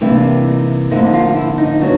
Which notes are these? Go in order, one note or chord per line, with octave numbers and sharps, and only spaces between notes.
C3 E3 G3 A#3 D4 E4
D#4
D2 D3 F3 A#3 D#4 E4
D#4 F4
E4
D#4
F#3 B3 D4